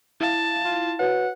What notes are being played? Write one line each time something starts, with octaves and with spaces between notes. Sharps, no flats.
E4 F5 A5
F4
F#4 B4 C#5 F#5